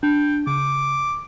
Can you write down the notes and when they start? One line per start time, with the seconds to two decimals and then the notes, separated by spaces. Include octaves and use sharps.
0.03 D4 G5
0.47 C#3 D6